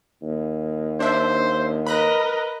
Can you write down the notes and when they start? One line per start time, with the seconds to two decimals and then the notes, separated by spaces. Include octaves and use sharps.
0.22 D#2
1.00 D4 C5 E5
1.87 A#4 B4 D#5 B5 F#6 A#6